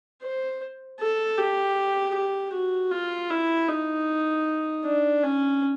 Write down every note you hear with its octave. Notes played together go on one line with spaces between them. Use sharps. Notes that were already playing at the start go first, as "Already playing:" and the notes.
C5
A4
G4
G4
F#4
F4
E4
D#4
D4
C#4